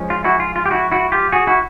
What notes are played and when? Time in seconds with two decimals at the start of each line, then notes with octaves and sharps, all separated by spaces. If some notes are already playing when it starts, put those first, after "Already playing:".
Already playing: F3 G#3 C#4
0.10 F4
0.24 E4 F#4
0.40 F4
0.56 F4
0.66 G4
0.71 E4 F#4
0.92 E4 F#4
1.12 F4 G4
1.32 F#4 G#4
1.47 E4 F#4